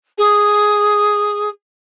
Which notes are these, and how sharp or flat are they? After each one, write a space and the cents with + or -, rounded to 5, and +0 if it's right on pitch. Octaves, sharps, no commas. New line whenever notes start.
G#4 +0